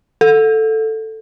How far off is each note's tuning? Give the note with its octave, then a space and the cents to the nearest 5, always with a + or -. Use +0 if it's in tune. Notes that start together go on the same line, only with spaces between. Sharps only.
A4 +5